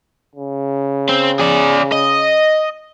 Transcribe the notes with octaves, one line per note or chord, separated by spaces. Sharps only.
C#3
C4
G#4 D5
D#5